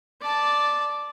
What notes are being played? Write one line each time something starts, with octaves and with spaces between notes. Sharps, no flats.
D5 A5